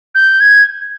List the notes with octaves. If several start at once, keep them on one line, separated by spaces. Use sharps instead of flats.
G6
G#6